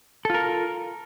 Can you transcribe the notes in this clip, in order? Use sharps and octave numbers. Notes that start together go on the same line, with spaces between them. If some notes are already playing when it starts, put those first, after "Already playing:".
F4 A4 A#4